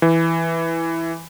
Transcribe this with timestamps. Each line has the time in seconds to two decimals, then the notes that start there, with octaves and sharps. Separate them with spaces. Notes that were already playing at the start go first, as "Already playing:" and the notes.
0.02 E3